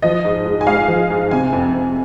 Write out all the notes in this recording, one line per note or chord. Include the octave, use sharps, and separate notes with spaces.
F3 D#5
G#2
G#2
G#5
G#3 F5
F3
G#2
C3 G#5
F2
F2